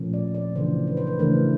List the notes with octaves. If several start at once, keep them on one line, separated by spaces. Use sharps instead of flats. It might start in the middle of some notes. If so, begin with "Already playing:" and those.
Already playing: A#2 F3 A3 C#4
D5
D5
C#3 E3 A3 D4 C5
B4
C5
B4
C#3 E3 A3 D4 A#4